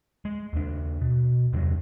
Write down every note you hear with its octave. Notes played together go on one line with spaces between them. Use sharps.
G#3
D#2 D4
B2
E2 G2 C3 F#3